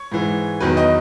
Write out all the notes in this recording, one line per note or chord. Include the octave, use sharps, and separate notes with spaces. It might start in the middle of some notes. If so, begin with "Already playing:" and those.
Already playing: C#5
G#2 E3
E2 D#3 F#3 B4
D#5